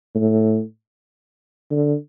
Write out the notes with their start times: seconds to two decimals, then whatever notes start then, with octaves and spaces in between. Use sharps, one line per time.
0.15 A2
1.71 D3